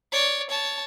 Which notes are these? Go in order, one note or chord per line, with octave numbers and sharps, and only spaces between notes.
C#5 D5
C#5 A5